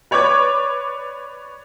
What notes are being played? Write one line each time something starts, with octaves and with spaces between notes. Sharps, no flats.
B4 C#5 D5 D6 G#6